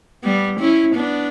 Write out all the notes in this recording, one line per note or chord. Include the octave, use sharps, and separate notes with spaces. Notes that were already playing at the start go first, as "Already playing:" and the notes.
G3 B3
C#4 E4
B3 D4